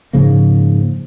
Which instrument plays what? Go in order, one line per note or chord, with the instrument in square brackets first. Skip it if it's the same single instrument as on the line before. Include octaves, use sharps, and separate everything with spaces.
[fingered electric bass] G#2 C#3 F3 A#3